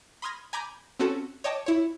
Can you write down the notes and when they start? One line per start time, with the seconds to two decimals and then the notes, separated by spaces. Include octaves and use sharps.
0.22 B5 C6 D#6 F6 G#6 A#6
0.53 G#5 A#5 B5 D6 G6 G#6
0.99 C4 C#4 F#4 A4
1.44 C#5 D#5 G5 A5 D6
1.66 E4 C#5